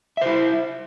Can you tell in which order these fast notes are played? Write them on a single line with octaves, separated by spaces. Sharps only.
E5 C5 E4